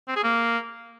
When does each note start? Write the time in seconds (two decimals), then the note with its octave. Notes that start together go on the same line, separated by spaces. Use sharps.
0.08 C4
0.16 G#4
0.24 A#3